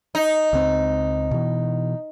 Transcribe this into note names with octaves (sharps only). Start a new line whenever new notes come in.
D#4
C#2 C4
B2 E3